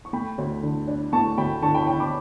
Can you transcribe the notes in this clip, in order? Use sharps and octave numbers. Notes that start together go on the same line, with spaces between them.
C#6
A3 G5 B5
D2
D3
D4
A3 A5 C#6
D2 G5 B5
D3 A5 C#6
G5 B5
C#6
D4 G5 B5
B5 D6